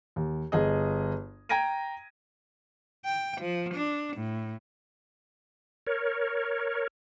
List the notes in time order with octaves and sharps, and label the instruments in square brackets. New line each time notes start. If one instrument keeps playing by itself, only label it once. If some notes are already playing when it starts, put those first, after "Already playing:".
[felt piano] D#2
G1 G#4 D#5
G5 A#5 G#6 A#6 D7 D#7
[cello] G5
F3
D4
A2
[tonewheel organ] A#4 C#5